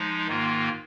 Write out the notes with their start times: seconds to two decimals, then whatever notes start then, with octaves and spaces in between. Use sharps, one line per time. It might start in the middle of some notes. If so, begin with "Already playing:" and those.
Already playing: F3 G#3 D#4
0.27 G#2 D#3 A#3 F4